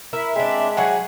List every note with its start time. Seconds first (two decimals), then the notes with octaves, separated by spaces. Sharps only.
0.13 E4 A#4 E5
0.36 G#3 C4 D4
0.77 F#3 G#4 F#5